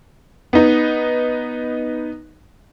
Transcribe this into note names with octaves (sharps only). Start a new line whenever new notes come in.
B3 D#4